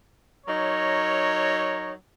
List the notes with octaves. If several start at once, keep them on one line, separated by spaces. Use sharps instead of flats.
F#3 D#4 A#4 C#5